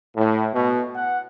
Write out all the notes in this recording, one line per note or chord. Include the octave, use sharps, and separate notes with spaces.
A2
B2
F#5